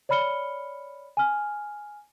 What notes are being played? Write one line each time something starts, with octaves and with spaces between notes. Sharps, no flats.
C#5 D5 B5 F6 C#7 G7
G#5 F6